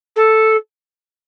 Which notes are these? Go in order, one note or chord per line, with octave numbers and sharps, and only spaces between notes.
A4